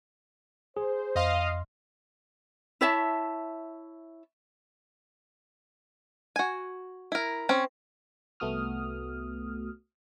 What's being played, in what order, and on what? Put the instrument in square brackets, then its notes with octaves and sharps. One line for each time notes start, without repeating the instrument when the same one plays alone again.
[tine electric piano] G#4 [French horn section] C5
[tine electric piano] F2 C6 [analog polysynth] D#5 F5
[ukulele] E4 C#5 E5 A5
[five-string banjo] F#4 G#5
E4 A#4
C4 C#4
[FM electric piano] C2 A3 B3 F#4 D#6 F6